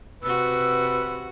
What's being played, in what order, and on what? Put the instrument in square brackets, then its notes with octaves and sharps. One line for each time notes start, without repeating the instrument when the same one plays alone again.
[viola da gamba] C3 F#4 [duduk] B4 [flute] E6